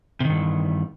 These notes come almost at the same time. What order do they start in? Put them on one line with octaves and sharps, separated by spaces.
C3 D#3 G2 E3